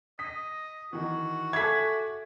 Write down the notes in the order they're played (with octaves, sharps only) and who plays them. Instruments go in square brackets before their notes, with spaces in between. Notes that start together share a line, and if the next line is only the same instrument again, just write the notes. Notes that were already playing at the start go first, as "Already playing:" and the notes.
[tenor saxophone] D#5 [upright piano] D#6 B6
[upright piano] D#3 E3 [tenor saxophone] F#4
[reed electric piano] A4 E5 [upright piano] G#5 D6 [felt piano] G#6 B6